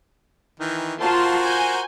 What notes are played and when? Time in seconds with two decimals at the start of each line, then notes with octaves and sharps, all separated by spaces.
0.60 D#3 E3
1.01 F4 F#4 A#4 C5 A5 C6
1.43 G#5 G6